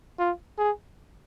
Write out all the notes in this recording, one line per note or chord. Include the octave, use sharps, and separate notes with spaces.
F4
G#4